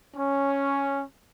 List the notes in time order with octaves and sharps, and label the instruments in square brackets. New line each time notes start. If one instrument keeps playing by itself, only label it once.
[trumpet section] C#4